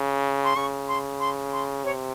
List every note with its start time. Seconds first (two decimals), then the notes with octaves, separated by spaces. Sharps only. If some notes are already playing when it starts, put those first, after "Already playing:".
Already playing: C#3
0.44 C6
0.56 C#3 C#6
0.88 C6
1.20 C6
1.52 C6
1.84 C3 C#5